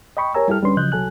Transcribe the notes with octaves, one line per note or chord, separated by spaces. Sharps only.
D#5 G5 B5 C#6
G4 A#4 C#5 G#5 A#5 E6
G3 E4 G4 A4 F6
D2 G3 C#4 D4 B4 C6
C#3 F3 F#3 D#5 F#6 G6
C2 F#3 A4 G#5 F#6